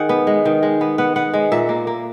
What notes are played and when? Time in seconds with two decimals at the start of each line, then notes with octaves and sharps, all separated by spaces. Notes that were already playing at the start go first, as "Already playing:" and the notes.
Already playing: D#3 G#4 F#5
0.09 B3
0.27 G#3
0.45 D#3
0.63 G#3
0.81 B3
0.98 B3 F#5
1.16 B3 F#5
1.34 G#3
1.52 A#2 E5
1.69 A#3
1.87 A#3